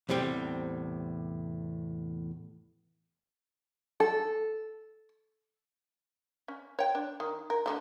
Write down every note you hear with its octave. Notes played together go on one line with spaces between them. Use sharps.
E2 A2 C3 G3 C4
A4
C#4
C#5 G5
D4
D#3
A#4
D3 G3 A3